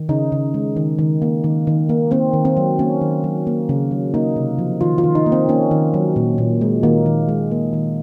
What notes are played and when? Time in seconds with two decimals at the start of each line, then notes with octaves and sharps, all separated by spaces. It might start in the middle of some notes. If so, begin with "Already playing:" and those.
Already playing: D#3
0.09 C#3 D#4
0.32 C#3
0.54 G#3
0.76 D#3
0.99 D#3
1.22 A#3
1.44 D#3
1.67 D#3
1.89 A#3
2.11 A#3 C4
2.33 D#3
2.45 C4
2.57 F#3
2.79 A#3 C#4
3.01 D#3
3.24 F#3
3.47 A#3
3.69 C#3
3.91 F#3
4.14 A#3 D#4
4.36 C3
4.58 F3
4.81 D#3 F4
4.98 F4
5.04 D#3
5.15 D#4
5.26 A#3
5.32 C4
5.49 A#3 C#4
5.71 D#3
5.94 F#3
6.16 A#2
6.38 A#2
6.61 G#3
6.83 D#3 A#3
7.06 D#3
7.29 G#3
7.51 A#3
7.73 D#3